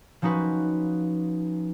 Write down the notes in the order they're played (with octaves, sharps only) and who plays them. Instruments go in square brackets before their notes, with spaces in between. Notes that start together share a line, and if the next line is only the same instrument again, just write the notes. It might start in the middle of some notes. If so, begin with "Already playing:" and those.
[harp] F3 C#4 D#4 F#4 B4